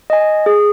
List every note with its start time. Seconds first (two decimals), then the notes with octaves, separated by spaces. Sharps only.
0.10 D#5 G#5
0.46 G#4